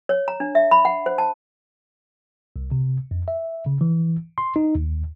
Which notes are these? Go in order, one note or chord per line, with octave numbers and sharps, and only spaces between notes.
C#5
A#5
D4
E5
B5
F#5
C5
A5
C2
C3
F2
E5
C#3
E3
C6
D#4
D#2